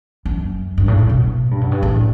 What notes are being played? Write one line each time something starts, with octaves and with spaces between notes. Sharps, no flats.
F#2
G2
A2
A2
B2
G2
F#2
G2
A2